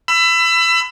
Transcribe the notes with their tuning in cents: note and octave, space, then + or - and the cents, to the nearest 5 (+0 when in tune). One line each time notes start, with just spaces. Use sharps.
B5 +25 E6 +25